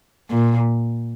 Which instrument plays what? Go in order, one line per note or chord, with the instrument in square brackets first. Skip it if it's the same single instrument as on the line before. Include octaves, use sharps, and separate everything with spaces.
[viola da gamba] A#2